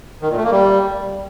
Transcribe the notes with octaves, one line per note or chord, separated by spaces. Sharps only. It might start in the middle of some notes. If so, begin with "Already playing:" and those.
D#3
A#2
A3
A#3
G3